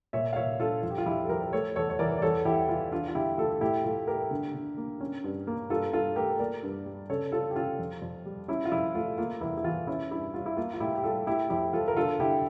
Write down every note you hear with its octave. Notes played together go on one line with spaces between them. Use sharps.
A#2 C#5 E5
F5
A#2 C#5 E5
D4 F4 A4
F2 F4
G4
F4
F2 E4 G4
A4
F3 G4 A#4
A#4
A3 A4 C#5
E2 A4 C#5
C#5
E3 A#4 D5
D5
E2 A4 C#5
E2 E4 G4
E3 F4
D4 F4
F4
D3 E4 G4
A3 F4 A4
A2 E4 G4
A2 F4 A4
A3 G4 A#4
D3
D3
A#3
C#4
G2
A#3
G2 F4 A4
G2 F4 A4
A3 G4 A#4
A#3 A#4 D5
G2
G3
C#3 A4 C#5
C#3 F4 A4
G4
C#4 F4
F2
F2
G3
C#4 E4
F4
F2 E4
A3 F4
A#3 F4
E2 E4
E4
E3 F4
C#4 E4
G2 E4
G3 F4
E4
A#3 F4
F4
A2 E4 G4
G4
G3 F4 A4
A3 E4 G4
F2 E4 G4
F3 F4 A4
A#4
D3 F4 A4
D3 E4 G4